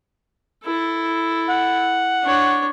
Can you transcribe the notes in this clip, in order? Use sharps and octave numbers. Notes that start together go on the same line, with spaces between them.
E4 A4
F#5
D4 C#5